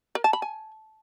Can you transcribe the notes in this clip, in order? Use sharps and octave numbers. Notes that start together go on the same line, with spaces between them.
A#4
A5
B5
G#5